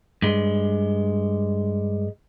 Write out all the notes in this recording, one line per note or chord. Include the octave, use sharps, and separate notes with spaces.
G2 G#3